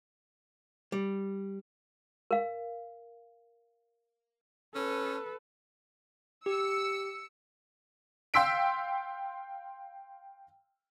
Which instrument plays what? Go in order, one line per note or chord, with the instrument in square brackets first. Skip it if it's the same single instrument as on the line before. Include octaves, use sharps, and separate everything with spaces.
[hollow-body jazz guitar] G3
[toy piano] A#4 F5
[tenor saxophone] C#4 [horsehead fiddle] A4 B4
[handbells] G4 [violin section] E6 C#7
[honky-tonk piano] F5 G5 C6 E6 B6 D7